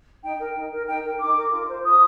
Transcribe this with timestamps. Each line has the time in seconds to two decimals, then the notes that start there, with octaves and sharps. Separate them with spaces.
0.23 D#4 G5
0.39 A#4
0.55 D#4
0.71 A#4
0.87 D#4 G5
1.03 A#4
1.19 D#4 D6
1.35 A#4
1.51 F4
1.67 C5
1.83 F4 D#6